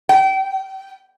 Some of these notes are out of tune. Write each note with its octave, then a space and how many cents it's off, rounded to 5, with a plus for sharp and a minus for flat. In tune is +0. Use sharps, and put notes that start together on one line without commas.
G5 -30